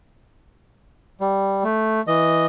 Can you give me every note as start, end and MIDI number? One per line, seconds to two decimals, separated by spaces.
1.21 1.63 55
1.64 2.02 57
2.08 2.46 52
2.08 2.46 75